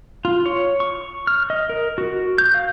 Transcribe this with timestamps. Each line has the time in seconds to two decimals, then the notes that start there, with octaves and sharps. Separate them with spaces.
0.25 F4
0.46 C#5
0.80 C#6
1.27 F6
1.50 D#5
1.70 A#4
1.98 F#4
2.38 G6
2.54 F5